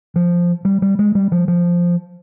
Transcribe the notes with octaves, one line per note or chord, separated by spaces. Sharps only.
F3
G3
G3
G#3
G3
F3
F3